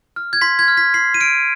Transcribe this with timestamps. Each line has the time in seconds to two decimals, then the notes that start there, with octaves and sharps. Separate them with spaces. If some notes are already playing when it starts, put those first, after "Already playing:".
0.16 F6
0.33 G#6
0.41 C6 B6
0.59 G#6
0.68 F6
0.77 B6
0.94 C6 C7
1.14 D#7
1.20 F6 D7